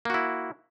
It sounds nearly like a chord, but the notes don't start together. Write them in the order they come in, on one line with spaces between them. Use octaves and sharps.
A#3 F#4 E4